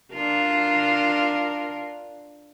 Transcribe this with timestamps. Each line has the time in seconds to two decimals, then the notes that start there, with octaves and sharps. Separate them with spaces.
0.13 D4 F4 A#4